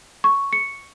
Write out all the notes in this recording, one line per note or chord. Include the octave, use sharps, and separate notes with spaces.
C#6
C#7